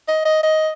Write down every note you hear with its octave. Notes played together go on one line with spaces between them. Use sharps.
D#5
D#5
D#5